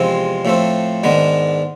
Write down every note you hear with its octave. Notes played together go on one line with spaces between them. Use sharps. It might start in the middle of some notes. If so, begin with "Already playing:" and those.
Already playing: E2 C3 F3 G#3 C4
A2 F3 A3 C4
G#2 D#3 G#3 B3 D4